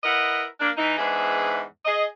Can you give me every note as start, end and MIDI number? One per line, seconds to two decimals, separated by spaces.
0.04 0.46 64
0.04 0.46 70
0.04 0.46 71
0.04 0.46 75
0.04 0.46 78
0.60 0.71 58
0.60 0.71 62
0.78 0.97 52
0.78 0.97 63
0.99 1.62 40
0.99 1.62 44
0.99 1.62 62
0.99 1.62 68
0.99 1.62 71
0.99 1.62 76
1.85 2.05 68
1.85 2.05 75